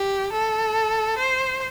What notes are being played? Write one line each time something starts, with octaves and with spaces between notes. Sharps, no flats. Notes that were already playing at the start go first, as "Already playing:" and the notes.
Already playing: G4
A4
C5